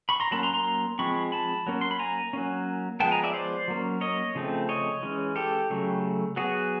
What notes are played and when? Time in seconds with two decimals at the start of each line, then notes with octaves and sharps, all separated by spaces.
0.09 B5 C#6
0.20 A#5 C6
0.31 F#3 A#3 C#4 A5 B5
0.43 A#5 C6
0.54 A#5 C6
0.99 F3 G#3 C4 B5 C#6
1.32 A5 B5
1.67 F#3 A#3 C#4
1.81 C6
1.91 B5
1.99 G#5 A#5
2.33 F#3 A#3 C#4
3.00 F3 G#3 B3 G5 A5
3.11 G#5 A#5
3.24 D5 E5
3.34 C5 D5
3.68 F#3 A#3 C#4
4.01 C#5 D#5
4.35 C#3 F3 A3 C4
4.69 C#5 D#5
5.03 E3 G#3 C#4
5.36 G4 A4
5.70 C#3 F#3 A3
6.36 F#3 B3 F#4 G#4